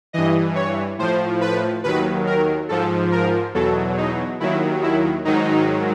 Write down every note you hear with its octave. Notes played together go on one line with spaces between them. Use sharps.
G2 E3 D#5
C#5
A2 F3 C5
B4
D#2 D#3 F#3 B4
A#4
G#2 F3 A4
A#4
E2 B2 F#3 A4
D#4
D#2 D#3 F#3 E4
E4
G#2 D#3 F#3 D#4